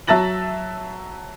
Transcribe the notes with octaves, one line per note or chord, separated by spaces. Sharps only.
F#3 E5 A5 A6 A#6 F#7